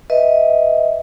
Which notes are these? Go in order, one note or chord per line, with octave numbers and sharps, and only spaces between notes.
B4 D#5 E5